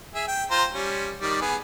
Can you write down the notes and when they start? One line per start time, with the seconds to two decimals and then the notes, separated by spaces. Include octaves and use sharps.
0.15 G#4 E5
0.28 G5
0.51 F4 C5 A#5
0.73 G3 C#4
1.21 D#3 G3 D5
1.41 B3 G#4